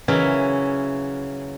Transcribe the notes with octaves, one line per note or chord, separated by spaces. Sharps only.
C#3 E3 F#3 C#4 E5